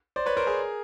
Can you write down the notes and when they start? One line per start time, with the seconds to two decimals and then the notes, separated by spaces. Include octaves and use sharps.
0.16 C5 D5
0.26 B4 C#5
0.37 A#4 C5
0.47 G#4 A#4